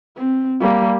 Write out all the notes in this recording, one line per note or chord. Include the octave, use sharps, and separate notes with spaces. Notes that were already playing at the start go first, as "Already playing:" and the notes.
C4
G3 A#3